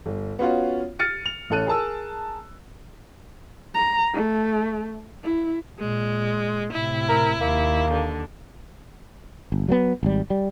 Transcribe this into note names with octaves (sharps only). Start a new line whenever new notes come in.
G1
B3 C#4 F4 F#4
F6 A6 C#7 D#7
F7
A1 C#4 A4 F#6 D#7
G#4 A#4 A5 E6
A#5
A3
E4
A#2 G#3
A2 C3 E4
A#4
D#2 A#3
D3
G1
F#3 A3 B3
G#1 G3
G3